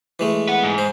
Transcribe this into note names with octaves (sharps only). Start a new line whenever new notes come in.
E3 G#3 A3
B4 F#5
G#2
C5